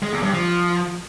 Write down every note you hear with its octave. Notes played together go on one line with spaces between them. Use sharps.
G#3
E2
G2
F3